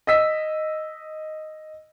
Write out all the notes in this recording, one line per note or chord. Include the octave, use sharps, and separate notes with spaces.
D#5 E6 B6